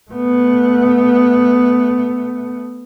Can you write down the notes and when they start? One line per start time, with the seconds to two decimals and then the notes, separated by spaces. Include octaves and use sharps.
0.11 A3 B3